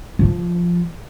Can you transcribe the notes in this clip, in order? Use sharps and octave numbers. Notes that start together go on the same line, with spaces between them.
F3